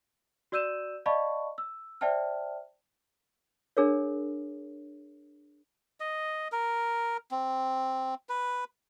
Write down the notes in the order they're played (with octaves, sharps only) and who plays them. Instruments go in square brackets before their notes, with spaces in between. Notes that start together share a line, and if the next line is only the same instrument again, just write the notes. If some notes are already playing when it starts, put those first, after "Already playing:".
[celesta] F#4 D5 E6 G6 D#7 E7
D5 D#5 F5 A5 B5 C#6
E6
C5 D5 E5 G5 A5 F6
[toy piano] D4 G#4 A#4 C#5
[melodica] D#5
A#4
C4
B4